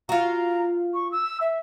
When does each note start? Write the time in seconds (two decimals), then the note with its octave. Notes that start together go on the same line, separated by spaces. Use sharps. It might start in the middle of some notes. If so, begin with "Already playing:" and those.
0.09 F4 F#4 A#5
0.94 C#6
1.12 E6
1.41 E5